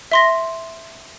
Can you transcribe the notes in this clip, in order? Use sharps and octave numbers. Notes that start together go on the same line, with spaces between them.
E5 C6 A#6